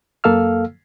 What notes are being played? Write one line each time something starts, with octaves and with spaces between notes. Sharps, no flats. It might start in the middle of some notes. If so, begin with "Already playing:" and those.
F#2 A#3 A4 F5 E6 F6